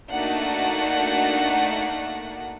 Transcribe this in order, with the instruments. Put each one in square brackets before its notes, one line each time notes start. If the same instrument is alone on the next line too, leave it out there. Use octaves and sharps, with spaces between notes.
[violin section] A3 A#3 D4 D#4 F#4 F#5